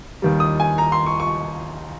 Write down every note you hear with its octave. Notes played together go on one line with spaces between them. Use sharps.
D#2 D#3 G3
D#6
G#5
A#5
C6
C#6
C#6